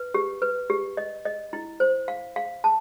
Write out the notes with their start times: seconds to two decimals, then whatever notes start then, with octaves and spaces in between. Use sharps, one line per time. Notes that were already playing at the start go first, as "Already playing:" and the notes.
Already playing: B4
0.14 G4
0.42 B4
0.70 G4
0.97 D#5
1.25 D#5
1.53 E4
1.80 C5
2.08 F5
2.36 F5
2.64 A5